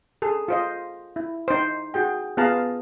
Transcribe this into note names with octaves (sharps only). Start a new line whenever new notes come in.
G#4 A4
F4 C5 D#5
E4
D#4 C5
F#4 G#4 G5
B3 F4 G#4 F5 A5 A#5